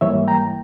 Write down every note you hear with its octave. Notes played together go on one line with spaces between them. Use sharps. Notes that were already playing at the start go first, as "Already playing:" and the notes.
G#2 E3 G3 A#3 C#5 E5
G5 A#5